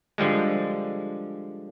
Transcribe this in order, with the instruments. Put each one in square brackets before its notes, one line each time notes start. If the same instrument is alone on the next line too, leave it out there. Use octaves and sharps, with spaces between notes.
[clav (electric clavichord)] D3 F3 G3 G#3